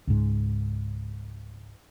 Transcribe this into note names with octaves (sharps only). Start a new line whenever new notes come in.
C#2 G#2